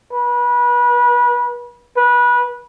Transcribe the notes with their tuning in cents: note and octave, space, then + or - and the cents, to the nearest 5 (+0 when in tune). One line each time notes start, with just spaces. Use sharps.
B4 -30
B4 -25